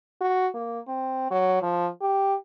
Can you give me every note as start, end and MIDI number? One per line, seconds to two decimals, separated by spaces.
0.21 0.48 66
0.54 0.80 58
0.88 1.30 60
1.31 1.59 54
1.62 1.87 53
2.01 2.35 67